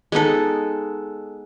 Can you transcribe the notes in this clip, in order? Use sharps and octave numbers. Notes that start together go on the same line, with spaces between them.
G#3 B3 D#4 A4